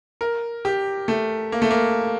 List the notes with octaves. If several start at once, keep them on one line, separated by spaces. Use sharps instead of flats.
A#4
G4
A3
A#3
A3
A#3